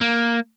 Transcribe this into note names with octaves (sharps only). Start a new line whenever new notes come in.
A#3